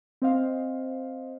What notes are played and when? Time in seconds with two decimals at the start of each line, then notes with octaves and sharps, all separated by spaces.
0.22 C4 C5 D#5 F5